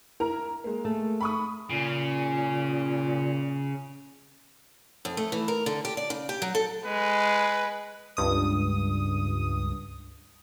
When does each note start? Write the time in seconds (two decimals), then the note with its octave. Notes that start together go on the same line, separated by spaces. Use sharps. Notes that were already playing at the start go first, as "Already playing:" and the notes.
0.20 E4 A#4 A#5
0.64 G#3 A#3
0.85 A3
1.21 B5 C#6 D#6
1.70 A#2 C#3
5.05 F2
5.17 A3
5.32 E3
5.48 A#4
5.66 D3
5.85 G4
5.97 D5
6.10 C#3
6.29 G4
6.42 F#3
6.55 A4
6.85 G#3 B4
8.17 C#2 G2 D#6